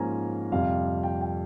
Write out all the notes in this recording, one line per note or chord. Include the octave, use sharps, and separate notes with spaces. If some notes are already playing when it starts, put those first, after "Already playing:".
Already playing: G#2 F3 A#3 C#4 C5 G#5 A#5
F2 C3 G3 F5
G5
G5